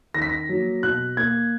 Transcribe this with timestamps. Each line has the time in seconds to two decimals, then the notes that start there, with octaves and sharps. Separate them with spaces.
0.14 D#3 A#6
0.22 B6
0.29 A#6
0.49 F#3 A#3
0.83 B2 F#6
1.17 A#3 G#6